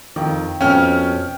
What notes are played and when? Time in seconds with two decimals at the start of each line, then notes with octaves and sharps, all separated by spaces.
0.16 F2 D#3
0.61 F2 B2 C#4 G5 F6